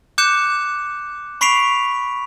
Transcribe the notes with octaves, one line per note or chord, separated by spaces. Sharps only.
D6 F#6 G6 C#7 E7
B5 C#6 B6 C7 D7 F7